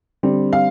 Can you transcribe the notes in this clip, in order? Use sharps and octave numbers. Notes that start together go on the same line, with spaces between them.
D3 G3 C4
F5